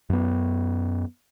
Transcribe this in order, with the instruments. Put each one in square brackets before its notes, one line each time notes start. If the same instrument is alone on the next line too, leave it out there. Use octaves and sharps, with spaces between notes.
[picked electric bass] F#2 B3